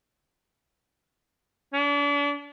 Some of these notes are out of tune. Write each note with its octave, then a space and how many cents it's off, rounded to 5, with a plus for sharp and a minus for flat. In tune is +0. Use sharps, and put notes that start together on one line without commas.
D4 -40